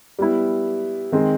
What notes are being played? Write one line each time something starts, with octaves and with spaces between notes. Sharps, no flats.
G3 B3 E4
D#3 G#3 C4